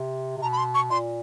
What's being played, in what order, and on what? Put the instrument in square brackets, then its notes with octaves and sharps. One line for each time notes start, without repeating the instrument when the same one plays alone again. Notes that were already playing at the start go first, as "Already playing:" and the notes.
Already playing: [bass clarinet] C3
C3
[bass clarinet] B2 [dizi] A#5
[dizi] B5
C6
C#6
[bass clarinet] A#2 [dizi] C6